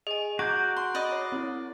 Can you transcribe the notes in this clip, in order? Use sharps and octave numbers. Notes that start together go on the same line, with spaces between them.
G#4 D#5 G#5
F#4 A#5 D6 G6 G#6 D7
C6
D5 D#5 B5
C#5
C4 E4